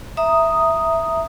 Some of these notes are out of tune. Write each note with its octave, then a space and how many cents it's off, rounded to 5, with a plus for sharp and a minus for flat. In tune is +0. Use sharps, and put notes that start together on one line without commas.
E5 +0 A#5 +0 D#6 +0